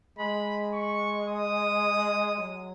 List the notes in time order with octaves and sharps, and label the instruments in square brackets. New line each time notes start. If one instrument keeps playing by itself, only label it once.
[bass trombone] G#3 [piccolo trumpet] B5
[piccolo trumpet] C#6
D#6
[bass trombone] F#3